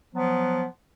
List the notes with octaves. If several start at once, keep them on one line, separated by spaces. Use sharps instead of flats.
F3 F#3 B3